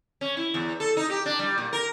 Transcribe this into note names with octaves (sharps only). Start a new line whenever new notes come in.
C#4
E4
E2
A4
D#4
G4
D4
G3
A#2
A#4